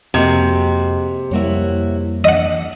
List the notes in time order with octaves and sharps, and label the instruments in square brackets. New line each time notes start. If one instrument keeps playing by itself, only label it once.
[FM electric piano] F2 A#3 [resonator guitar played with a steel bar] C3 [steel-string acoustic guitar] G#3 F#4
[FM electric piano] F2 G3 A#3 [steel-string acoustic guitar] E4 F#4 C#5
[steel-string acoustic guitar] D4 [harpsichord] D#5 F#5